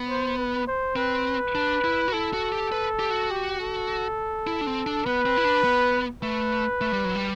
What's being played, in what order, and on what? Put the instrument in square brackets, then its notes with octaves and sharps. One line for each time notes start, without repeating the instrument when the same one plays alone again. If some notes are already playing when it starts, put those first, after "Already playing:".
Already playing: [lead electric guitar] B3
[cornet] C5
B4
C5
[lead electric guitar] C4 [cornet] B4
[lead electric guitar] D4
E4
F#4
[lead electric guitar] E4 [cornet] A4
[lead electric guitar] F#4
G4
B4
G4
F#4
[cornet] G4
A4
[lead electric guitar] E4
D4
C4
D4
[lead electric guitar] B3 [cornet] B4
[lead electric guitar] C4
E4
D4
B3
[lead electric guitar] A3 [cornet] B4
[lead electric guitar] A3
G3
F#3
G3